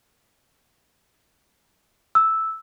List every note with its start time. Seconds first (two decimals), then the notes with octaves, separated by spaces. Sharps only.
2.15 E6